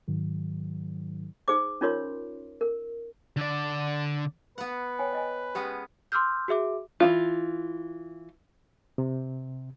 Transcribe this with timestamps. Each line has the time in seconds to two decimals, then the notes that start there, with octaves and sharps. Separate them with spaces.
0.08 G#2 D#3 F#3
1.48 D#4 G#4 C5 D6
1.81 C#4 D#4 F4 A#4 C#5 C6
2.61 A#4
3.37 D3 D5
4.58 B3 B4 F#5
4.99 C#5 G5 G#5
5.13 D5 D#5 G#5
5.55 G#3 B3 C#4 G4 G5
6.12 C6 D6 E6 F6 G6
6.48 F#4 G#4 E5 D6
7.00 E3 F3 F4
8.98 C3